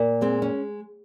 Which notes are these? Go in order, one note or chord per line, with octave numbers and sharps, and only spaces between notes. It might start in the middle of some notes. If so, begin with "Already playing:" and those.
Already playing: A#2
G#3 C4
C#4